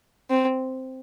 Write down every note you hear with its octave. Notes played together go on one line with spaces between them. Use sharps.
C4